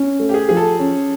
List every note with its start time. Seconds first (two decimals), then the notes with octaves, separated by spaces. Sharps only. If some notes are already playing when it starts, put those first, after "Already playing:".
Already playing: C#4
0.19 A3
0.29 G4
0.34 G#4
0.49 F3 G#4
0.57 A4
0.79 C#4